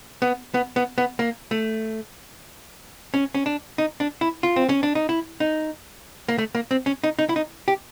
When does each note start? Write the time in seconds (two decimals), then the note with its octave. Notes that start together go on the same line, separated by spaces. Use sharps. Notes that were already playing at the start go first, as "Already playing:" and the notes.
0.22 B3
0.54 B3
0.76 B3
0.98 B3
1.19 A#3
1.51 A3
3.14 C#4
3.35 C#4
3.46 D4
3.78 D#4
4.00 D4
4.21 E4
4.43 F4
4.56 C4
4.69 C#4
4.83 D4
4.95 D#4
5.09 E4
5.40 D#4
6.29 A#3
6.38 A3
6.55 A#3
6.71 C4
6.86 C#4
7.04 D#4
7.19 D#4
7.29 E4
7.36 D#4
7.68 G4